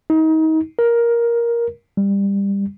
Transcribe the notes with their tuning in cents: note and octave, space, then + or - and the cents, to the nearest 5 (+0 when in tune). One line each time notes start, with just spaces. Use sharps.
D#4 +30
A#4 +10
G3 +20